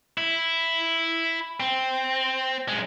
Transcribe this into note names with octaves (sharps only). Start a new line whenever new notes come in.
E4
C4
F#2 G#3